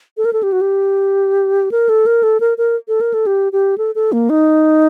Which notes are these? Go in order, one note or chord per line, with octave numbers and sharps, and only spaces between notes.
A4
A#4
A4
G4
F#4
G4
A#4
A4
A#4
A4
A#4
A#4
A4
A#4
A4
G4
G4
A4
A4
A#3
D#4